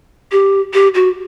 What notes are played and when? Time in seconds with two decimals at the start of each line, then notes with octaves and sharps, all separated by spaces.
0.32 G4
0.74 G4
0.94 F#4